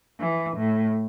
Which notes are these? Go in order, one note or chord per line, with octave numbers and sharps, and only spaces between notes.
E3
A2